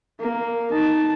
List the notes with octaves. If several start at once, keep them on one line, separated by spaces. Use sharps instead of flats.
A#3
D#4 A5